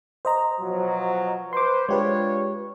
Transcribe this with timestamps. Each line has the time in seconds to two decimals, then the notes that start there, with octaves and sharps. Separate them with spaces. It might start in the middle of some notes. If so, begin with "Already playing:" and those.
0.25 C5 D#5 A#5
0.60 B2 F3 F#3
1.53 B4 C5 C6 D6
1.89 G#3 D4 F4 G4 B4 C#5